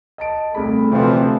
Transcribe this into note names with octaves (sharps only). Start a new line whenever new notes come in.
D#5 A5 D7
C2 A3 G#4 B5
D2 C3 E3 F3